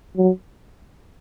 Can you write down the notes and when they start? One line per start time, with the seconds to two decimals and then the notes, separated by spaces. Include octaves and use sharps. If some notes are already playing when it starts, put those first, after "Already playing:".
0.17 F#3